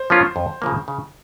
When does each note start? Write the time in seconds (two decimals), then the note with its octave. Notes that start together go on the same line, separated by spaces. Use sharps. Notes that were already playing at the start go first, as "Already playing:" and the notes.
Already playing: C5
0.10 F3 A#3 C#4 F4
0.36 F2
0.62 C#3 F3 A#3
0.88 C#3